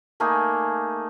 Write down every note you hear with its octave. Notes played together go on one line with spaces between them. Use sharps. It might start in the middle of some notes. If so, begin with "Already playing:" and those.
A3 A#3 D#4 G#4